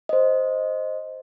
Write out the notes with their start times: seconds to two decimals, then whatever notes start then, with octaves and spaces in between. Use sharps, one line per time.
0.09 C5 D#5